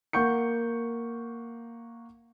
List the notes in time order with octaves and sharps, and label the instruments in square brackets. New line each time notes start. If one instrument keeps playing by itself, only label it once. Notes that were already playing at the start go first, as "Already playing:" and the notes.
[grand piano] A#3 F#5 C#6 G6 C#7